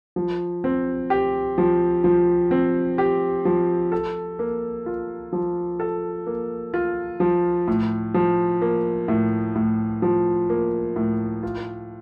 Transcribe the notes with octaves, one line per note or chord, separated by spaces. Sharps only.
F3
C4
G4
F3
F3
C4
G4
F3
A4
A#3
F4
F3
A4
A#3
F4
F3
A2
F3
A#3
A2
A2
F3
A#3
A2
F4